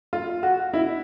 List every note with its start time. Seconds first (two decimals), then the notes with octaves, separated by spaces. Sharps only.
0.13 F4
0.43 F#4
0.74 E4